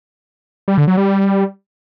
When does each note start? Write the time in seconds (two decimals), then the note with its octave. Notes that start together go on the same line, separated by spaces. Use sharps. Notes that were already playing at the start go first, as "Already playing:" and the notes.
0.68 G3
0.78 D3
0.87 F#3
0.97 G3